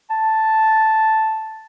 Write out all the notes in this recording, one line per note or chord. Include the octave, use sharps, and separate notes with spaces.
A5